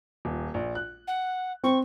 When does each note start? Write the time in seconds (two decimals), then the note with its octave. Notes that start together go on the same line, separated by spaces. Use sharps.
0.25 D#1
0.54 A#1
0.75 F#6
1.07 F#5
1.64 C4 C#6